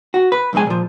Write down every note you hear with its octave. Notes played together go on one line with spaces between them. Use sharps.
F#4
B4
B1 F2 B2 G#3 G#5
A#2 F3